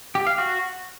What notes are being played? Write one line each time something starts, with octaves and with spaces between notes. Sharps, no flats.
G4
F5
F#4